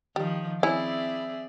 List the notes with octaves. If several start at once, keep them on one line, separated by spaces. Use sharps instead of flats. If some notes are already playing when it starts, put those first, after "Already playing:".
D#3 F3 G3
C4 C#4 E4 G#4 D5 E5